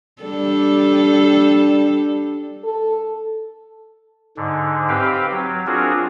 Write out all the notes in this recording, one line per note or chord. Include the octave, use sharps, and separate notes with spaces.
G3 D4 A4
A4
G#2 D3
C4 G4 B4 F5 G5
F#3
C4 D4 F4 F#4 G#4 A#4